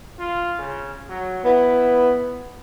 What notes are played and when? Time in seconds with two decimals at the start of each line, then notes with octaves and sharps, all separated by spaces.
0.19 F4
0.59 C#3
1.09 F#3
1.45 B3 E4